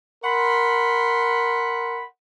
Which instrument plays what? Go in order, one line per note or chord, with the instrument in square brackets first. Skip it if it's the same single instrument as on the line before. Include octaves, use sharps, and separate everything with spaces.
[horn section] A#4 F#5 B5 C6